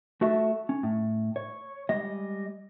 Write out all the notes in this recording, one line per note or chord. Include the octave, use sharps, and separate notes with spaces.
A3 F#4 A4 E5
C#4
A2
C#5
G3 G#3 D#5